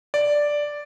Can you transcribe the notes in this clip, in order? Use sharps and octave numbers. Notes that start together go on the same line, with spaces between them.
D5